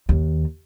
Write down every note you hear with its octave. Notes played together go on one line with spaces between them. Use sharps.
D#2